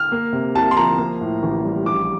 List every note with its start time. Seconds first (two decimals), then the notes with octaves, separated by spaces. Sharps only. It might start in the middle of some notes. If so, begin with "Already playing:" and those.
Already playing: F6
0.12 A#3
0.33 C3
0.55 C2 A5
0.71 C6
0.77 F3 A#5
0.98 A#3
1.21 A2
1.43 A1
1.65 G3
1.86 A#1 D6